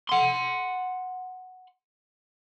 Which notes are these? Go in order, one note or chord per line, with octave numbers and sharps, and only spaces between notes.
F#5 C6